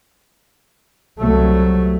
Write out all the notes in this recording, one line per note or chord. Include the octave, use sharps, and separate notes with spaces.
C2 F#3 A3